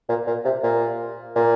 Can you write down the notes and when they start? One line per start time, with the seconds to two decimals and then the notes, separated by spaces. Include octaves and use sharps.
0.09 A#2
0.27 A#2
0.45 C3
0.63 A#2
1.36 A#2